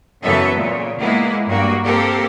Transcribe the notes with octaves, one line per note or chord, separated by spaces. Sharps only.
F#2 C#3 E3 B3 A4 E5
A#2 C#3
G#3 A#3 B3 E4
G2 A#3 F#4
A#3 C4 G4 A4 A#4